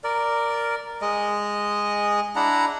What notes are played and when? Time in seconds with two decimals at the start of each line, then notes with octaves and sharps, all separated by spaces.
0.04 A#4 D5
1.02 G#3 D#5
2.36 D4 E4 F#5 A#5